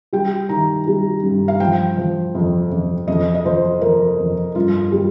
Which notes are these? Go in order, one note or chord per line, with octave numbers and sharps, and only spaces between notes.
G3 G5
D#3 A#5
G3
G2
F5
F3 G5
F3
F2
F2
F2 D#5
D#5
F3 C5
F3 A#4
F2
G2 F4
G3